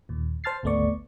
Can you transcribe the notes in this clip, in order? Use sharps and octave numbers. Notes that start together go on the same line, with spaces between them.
D#2 A#2
C5 A5 F6 A6 C7
G#1 D2 A3 B3 D5 C#6